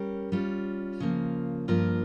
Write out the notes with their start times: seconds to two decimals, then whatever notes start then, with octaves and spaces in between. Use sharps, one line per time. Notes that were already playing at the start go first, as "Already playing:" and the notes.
Already playing: G3 C#4 G4 A#4
0.32 G3 C#4 F4
1.00 C#3 F3 A#3
1.68 G2 F3 A#3 F4 A#4